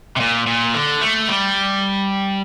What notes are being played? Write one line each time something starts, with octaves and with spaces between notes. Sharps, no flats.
C3
A#2
A#2
D3
A3
G3